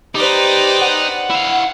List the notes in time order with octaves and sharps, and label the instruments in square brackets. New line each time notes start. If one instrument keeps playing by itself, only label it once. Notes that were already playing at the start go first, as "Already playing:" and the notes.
[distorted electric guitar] D#4 [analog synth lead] G4 [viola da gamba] B4 C5 D5
[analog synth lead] F#5
[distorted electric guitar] E4 F5